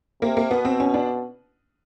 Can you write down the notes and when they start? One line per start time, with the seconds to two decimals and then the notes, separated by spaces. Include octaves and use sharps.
0.22 C3 A#3
0.37 A#3
0.51 B2 B3
0.65 C4
0.80 C#4
0.94 D4